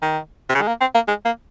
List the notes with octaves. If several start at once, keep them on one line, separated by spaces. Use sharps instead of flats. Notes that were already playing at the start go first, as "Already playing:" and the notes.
D#3
C3
C#3
G#3
A#3
C4
A#3
G#3
A#3